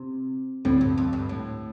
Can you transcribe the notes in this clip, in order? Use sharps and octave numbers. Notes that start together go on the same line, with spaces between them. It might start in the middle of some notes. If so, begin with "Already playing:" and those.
Already playing: C3
D2 A2 D3 G3 C4
G2
F2
G2
A2